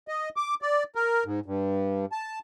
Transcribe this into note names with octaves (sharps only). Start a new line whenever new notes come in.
D#5
D6
D5
A#4
G#2
G2
A5